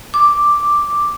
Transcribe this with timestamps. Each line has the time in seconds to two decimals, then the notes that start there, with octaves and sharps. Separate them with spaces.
0.14 D6